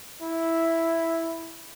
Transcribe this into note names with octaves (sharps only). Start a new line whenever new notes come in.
E4